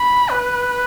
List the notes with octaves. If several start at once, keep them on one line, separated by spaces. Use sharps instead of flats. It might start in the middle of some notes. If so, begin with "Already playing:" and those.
Already playing: B5
B4